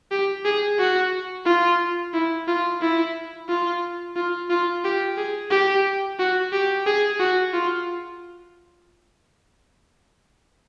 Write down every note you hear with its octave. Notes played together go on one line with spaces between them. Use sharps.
G4
G#4
F#4
F4
E4
F4
E4
F4
F4
F4
G4
G#4
G4
F#4
G4
G#4
F#4
F4